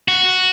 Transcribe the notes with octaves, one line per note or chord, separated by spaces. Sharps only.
F#4